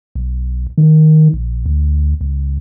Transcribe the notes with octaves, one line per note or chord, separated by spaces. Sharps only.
B1
D#3
A#1
D2
C#2